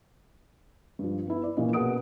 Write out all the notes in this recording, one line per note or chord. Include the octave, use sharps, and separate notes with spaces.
G2 F3
B3 E4
D5
A#2 E3 F3 A#3 C#4 D#5
B2 G#4 A#4 F#5 D#6 D7